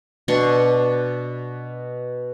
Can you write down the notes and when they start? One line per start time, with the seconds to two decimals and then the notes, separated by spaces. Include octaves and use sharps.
0.28 B2 D4 C6 C#6